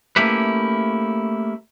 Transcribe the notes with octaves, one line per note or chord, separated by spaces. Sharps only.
A3 A#3 C#4 E4 G4 B4